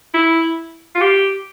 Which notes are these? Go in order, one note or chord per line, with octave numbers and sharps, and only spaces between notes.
E4
F4
G4